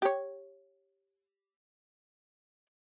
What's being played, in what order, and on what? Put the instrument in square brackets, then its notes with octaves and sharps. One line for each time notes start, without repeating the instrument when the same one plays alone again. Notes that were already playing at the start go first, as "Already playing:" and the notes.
[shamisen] G4 C#5